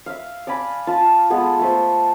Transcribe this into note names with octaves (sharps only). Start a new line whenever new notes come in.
E5 F5
D5 F5 G#5 B5
F4 A5
G#3 B3 G#4 A4
A3 A4 B4 C5